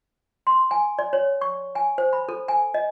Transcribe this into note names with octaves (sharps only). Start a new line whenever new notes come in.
C6
G#5
D5
C#5
C#6
G#5
C5
B5
A4
G#5
D#5